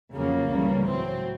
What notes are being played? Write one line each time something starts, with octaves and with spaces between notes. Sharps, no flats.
F2 C#3 F#3 A#3
C#2 C#3 E3 G3
A2 F#3 C4